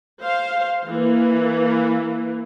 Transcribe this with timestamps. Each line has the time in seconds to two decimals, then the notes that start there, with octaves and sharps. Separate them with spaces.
0.21 C5 F5
0.86 E3 A#3